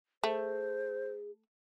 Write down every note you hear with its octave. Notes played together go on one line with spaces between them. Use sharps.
A3 G#4 C5